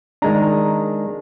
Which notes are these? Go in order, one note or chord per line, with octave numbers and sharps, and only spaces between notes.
D#3 G#3 D4 A#5